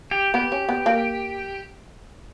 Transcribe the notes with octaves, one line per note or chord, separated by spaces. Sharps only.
G4
B3 G4
C#4
B3
A#3